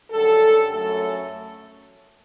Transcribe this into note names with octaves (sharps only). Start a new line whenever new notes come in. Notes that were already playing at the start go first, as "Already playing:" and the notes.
F#2 D3 G3 A4
F#2 F#3 A3 A4